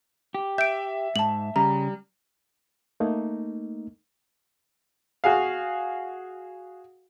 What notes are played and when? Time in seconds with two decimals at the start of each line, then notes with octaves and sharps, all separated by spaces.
0.35 G4
0.58 E5 G6 D7
1.16 G#2 A5 F#7
1.56 C#3 G3 A#5
3.00 A3 A#3 D#4
5.24 F#4 G#4 F5